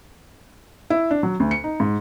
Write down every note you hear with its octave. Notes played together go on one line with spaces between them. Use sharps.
E4
D4
F#3
D2
C#7
D#4
G#2